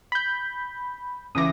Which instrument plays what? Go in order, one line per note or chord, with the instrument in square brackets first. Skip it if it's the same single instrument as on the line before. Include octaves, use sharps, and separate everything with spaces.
[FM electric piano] B5 G6
[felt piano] C#2 E3 D6 [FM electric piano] D#6 A#6